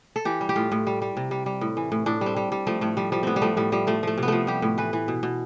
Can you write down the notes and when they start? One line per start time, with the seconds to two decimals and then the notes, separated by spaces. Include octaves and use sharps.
0.16 A4
0.25 E3 G4
0.41 G3
0.49 G4
0.56 A2 F4
0.72 A2
0.87 G3
1.02 G3
1.17 C3
1.31 G3
1.46 G3
1.61 A2
1.77 E3
1.92 A2
2.06 A2 D4
2.21 G3 C4
2.36 G3
2.52 G3
2.67 F3 A3
2.81 A2 A3
2.97 F3 G3
3.12 F3 G3
3.23 A2 B3 C4
3.36 G3
3.42 F3 A3
3.57 A2 G3
3.72 F3 G3
3.87 F3 A3
4.03 F3 A3
4.18 C3
4.23 B3
4.28 F3 A3
4.47 G3 G4
4.62 A2
4.78 E3 B4
4.93 E3
5.08 B2
5.23 B2